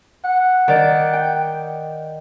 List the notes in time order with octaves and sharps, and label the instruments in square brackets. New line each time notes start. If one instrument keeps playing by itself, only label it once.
[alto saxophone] F#5
[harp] D#3 D5
G5